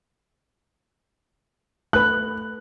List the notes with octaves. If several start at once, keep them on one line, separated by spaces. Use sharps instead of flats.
A3 B4 F#6